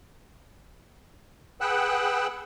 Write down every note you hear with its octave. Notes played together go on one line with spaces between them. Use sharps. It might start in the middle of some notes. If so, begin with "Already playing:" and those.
G#4 B4 F#5 G5 E6 F#6